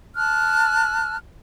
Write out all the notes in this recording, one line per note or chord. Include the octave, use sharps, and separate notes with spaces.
A5 F6 F#6